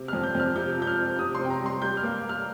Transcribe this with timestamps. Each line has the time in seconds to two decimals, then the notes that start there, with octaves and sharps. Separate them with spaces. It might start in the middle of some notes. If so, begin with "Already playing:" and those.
Already playing: C3
0.08 F6
0.13 F2
0.23 G6
0.35 F2 F6
0.56 C3 G6
0.77 F3
0.82 G6
0.87 F6
0.98 C4
1.19 C3 D#6
1.35 C6
1.39 C3
1.45 G5
1.50 A#5
1.60 G3
1.66 C6
1.82 G3 G6
1.97 F6
2.03 A#3
2.23 A#3
2.29 F6